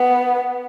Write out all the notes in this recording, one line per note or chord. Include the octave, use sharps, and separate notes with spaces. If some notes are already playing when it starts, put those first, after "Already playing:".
Already playing: B3